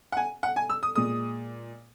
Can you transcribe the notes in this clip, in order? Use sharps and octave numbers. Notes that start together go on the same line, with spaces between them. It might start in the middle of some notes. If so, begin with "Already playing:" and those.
F#5
G#5
F#5
G#5
E6
D#6
A#2 G#3 D#6